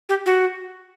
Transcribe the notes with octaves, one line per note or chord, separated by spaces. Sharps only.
G4
F#4